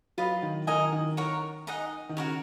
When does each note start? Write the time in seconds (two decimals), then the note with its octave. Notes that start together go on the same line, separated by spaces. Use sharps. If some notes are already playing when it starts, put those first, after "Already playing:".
0.18 F#3 F4 B4 D#5
0.42 D#3
0.67 D#3 D#4 A#4 D#5 G#5
0.92 D#3
1.17 A#4 C#5 F#5 A#5
1.67 D#4 G#4 D#5 F#5
2.09 D#3
2.17 C#3 F#4 A#4 C#5